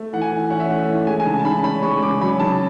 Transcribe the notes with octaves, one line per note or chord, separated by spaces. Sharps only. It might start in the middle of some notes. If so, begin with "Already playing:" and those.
Already playing: A3
E3 F#5
G#5
E3
C#4 F#5
E5
A3 F#5
E3
G#3 G#5
G#5
C#3 A5
A5
C#3 B5
C#4 B5
G#3 C#6
C#3 D6
F#3 B5
C#3 A5